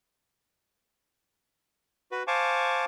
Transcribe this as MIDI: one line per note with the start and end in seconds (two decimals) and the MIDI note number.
2.12 2.23 66
2.12 2.23 71
2.27 2.85 72
2.27 2.85 77
2.27 2.85 80
2.27 2.85 81
2.27 2.85 85
2.27 2.85 86